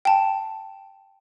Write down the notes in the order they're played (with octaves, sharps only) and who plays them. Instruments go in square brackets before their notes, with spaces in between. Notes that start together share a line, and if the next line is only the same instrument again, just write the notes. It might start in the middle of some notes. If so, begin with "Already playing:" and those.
[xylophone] G5 A5